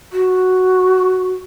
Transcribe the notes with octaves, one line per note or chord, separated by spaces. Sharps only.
F#4